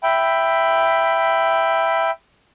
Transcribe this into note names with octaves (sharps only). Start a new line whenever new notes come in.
E5 G5 B5